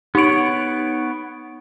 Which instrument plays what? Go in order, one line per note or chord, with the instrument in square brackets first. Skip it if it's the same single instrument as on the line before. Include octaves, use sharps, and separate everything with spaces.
[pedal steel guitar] B3 C#5 [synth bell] D#4 D7